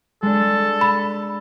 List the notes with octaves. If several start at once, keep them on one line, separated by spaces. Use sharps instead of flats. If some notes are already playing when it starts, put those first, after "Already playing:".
G#3 D4 A4
B5